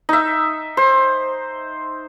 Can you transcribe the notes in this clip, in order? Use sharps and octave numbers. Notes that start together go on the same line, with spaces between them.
D#4 E5
C5